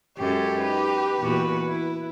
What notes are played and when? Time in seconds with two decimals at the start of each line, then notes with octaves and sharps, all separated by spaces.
0.18 F#2 G#3 G4 A4
0.59 D#4 B4
1.20 E2 A#2 F#4
1.68 E4